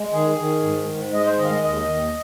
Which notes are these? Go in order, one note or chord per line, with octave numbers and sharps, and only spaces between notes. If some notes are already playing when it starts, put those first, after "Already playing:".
Already playing: G#3
D#3 G#4
D#3
G#2
G#2
G#3 D#5
C5
D#3 D#5
F5
D#5
D#2 D#5
D#2